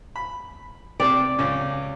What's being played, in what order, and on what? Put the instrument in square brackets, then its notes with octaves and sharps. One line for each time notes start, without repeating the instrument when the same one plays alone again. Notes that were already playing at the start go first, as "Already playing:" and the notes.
[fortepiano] B5
[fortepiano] C3 G4 [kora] D5
[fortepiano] C#2 C#4